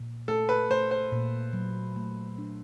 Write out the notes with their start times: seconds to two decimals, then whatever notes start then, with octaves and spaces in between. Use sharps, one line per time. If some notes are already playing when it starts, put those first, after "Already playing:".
Already playing: A#2
0.28 A3 A4
0.49 B4
0.70 A3 C5
0.91 C5
1.12 A#2
1.53 F#3
1.96 A3
2.38 D4